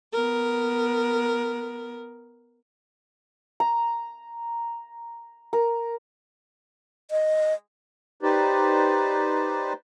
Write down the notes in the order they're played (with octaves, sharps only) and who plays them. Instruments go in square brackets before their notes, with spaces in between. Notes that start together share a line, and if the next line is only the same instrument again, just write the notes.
[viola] B3 A#4
[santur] A#5
A#4
[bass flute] D#5
[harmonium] D#4 G4 B4 C5 D5